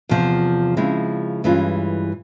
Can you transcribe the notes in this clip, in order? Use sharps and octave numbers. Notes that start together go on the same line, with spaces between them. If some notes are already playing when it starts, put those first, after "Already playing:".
E2 C3 F3
C#3 F3 G#3 C4 E4
G2 E3 G#3 C#4 F4